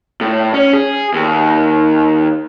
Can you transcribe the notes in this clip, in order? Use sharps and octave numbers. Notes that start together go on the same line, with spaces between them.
A2
C#4
G#4
D#2